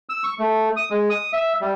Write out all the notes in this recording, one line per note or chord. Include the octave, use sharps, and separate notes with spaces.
E6
C#6
A3
D#6
G#3
D#6
E5
G3